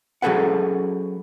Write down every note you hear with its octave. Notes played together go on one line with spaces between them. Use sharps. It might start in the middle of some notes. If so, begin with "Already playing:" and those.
F#3 C#4 G#4 A4 B4 F#5